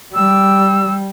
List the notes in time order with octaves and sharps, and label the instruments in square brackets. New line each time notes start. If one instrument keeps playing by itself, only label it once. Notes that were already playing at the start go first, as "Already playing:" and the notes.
[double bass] G3 [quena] E6